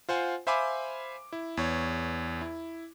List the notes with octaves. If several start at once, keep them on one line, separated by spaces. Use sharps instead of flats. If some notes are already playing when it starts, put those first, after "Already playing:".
F4 C5 F#5 G#5
C5 E5 F5 G#5 B5 D6
E4
E2 C#5
E4